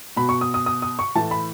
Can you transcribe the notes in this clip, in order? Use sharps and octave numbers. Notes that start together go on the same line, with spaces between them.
B2 B5
C#6
D#6
D#6
D#6
D#6
C#6
A2 E3 A5
B5